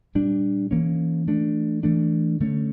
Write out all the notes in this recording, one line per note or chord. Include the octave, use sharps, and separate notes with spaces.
A#2 G3 D4
E3 A#3 C#4
E3 A3 D4
E3 A3 D4
D3 A3 C#4